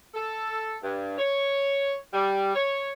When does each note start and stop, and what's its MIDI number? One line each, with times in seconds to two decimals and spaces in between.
0.14 0.75 69
0.82 1.17 43
1.18 1.95 73
2.13 2.54 55
2.55 2.90 73